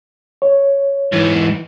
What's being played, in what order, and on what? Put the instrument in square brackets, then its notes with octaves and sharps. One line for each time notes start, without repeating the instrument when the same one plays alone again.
[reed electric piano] C#5
[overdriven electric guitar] G#2 E3